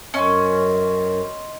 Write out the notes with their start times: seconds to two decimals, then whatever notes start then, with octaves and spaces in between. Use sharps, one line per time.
0.14 F#2 C#4 D#5 C6